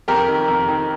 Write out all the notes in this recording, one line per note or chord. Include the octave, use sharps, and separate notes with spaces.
F2 G4 A#4
D#3
F2
D#3